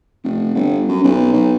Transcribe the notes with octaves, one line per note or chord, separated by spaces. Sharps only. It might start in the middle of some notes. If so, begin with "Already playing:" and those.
F1
G1
F#2
B1
B1